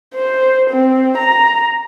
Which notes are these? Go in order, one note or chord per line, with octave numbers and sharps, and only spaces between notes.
C5
C4
A#5